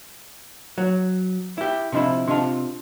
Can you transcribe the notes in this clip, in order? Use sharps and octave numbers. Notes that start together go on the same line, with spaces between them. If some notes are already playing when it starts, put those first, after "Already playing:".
F#3
E4 G4
C3 F3 D4 E4 D#5 B5
C3 D4 F4 D#5 A5